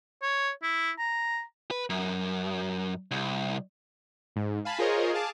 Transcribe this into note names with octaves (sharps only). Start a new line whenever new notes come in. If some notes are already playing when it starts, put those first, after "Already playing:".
C#5
E4
A#5
B4
F#2
C2
G#2
F5 G#5 A5 B5
F4 G#4 A#4 C5 C#5 D#5
G#4 F5 A5 D6